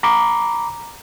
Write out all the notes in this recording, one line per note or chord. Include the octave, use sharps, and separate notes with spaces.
A#5 B5 D6